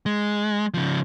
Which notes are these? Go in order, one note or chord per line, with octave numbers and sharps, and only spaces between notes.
G#3
C#3 F3